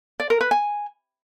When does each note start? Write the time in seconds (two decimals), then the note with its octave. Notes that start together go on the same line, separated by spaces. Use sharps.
0.20 D5
0.30 A#4
0.41 B4
0.51 G#5